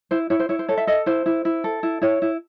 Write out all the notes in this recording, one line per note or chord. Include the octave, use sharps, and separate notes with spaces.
E4 C5
E4 C#5
C5
E4 C#5
C5
A4 C#5
E5
A4 D#5
E4 C5
E4
E4
A4
E4
E4 C#5
E4